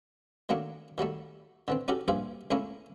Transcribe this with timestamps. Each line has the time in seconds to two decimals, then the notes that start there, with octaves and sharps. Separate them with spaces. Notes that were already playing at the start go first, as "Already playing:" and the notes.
0.49 D#3 F#3 A3 A#3 D4
0.98 D#3 F#3 G3 A3
1.68 D3 E3 C4
1.88 C#4 D#4 F#4 G4 A4 A#4
2.08 A#1 G2 G#4 C5 E5 F5
2.51 C#2 A3 A#3 C#4 E4 A#4